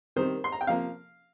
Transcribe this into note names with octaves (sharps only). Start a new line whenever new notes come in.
C3 D#3 G3 C5
C6
A#5
G5
C3 F3 A#3 F5